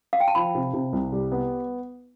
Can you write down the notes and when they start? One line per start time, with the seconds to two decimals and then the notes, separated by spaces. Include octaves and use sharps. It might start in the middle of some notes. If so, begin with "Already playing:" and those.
0.13 F5
0.20 G5
0.28 A5
0.35 F3 B5
0.55 C3
0.73 C3
0.93 C2
1.12 G3
1.32 B3